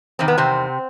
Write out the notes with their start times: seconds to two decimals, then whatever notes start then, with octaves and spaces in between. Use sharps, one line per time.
0.19 E2 C3 D#3 C4
0.28 B3
0.38 C3 C4